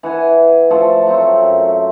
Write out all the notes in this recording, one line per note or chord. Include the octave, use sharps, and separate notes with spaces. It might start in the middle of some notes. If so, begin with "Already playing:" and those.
E3 F#5 G#5
F3 A3 A4
F#3 A3 C4
F#2